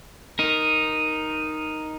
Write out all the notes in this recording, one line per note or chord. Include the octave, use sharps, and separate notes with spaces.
D#4 A#4